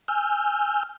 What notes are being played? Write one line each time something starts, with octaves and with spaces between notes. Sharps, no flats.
G#5 E6 F6 G6